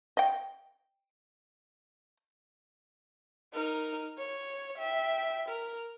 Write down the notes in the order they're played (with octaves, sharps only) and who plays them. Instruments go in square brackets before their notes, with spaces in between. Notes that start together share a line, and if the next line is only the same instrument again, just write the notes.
[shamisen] D#5 G5
[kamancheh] D#4 A#4
C#5
E5 G5
A#4